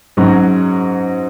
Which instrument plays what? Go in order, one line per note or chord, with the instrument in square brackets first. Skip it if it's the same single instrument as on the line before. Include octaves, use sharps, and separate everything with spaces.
[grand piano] G#2 F#3 C#4 F#4